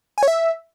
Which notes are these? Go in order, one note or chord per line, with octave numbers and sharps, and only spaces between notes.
G#5
C#5
E5